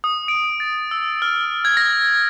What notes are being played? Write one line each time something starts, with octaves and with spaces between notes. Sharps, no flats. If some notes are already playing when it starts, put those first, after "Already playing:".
D#6
D7
A6
E6
F6
G#6
A#6